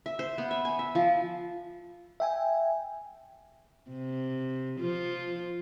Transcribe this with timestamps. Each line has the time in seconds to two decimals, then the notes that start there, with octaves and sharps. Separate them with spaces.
0.06 E5
0.19 C5
0.38 B3
0.51 E5
0.65 G#5
0.79 E5
0.95 F3
2.20 E5 G5 G#5
3.90 C3
4.80 F3 F4